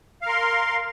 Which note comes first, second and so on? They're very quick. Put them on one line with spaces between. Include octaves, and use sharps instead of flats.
F5 A#4 C6